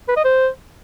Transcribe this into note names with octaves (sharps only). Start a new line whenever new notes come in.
B4
D#5
C5